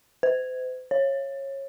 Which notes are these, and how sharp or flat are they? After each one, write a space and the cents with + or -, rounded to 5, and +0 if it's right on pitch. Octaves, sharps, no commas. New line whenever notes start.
C5 -40
C#5 -20